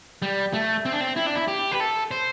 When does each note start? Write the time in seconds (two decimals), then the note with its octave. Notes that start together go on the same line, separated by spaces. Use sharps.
0.22 G3
0.53 A3
0.85 C4
0.93 D4
1.01 C4
1.16 E4
1.26 D4
1.35 E4
1.48 G4
1.72 B4
1.80 A4
2.11 C5